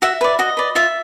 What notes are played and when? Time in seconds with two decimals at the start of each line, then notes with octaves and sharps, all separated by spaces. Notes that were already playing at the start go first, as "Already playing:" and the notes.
0.02 F#4 E5
0.21 B4 D5
0.39 F#4 D#5
0.57 B4 D5
0.75 F4 E5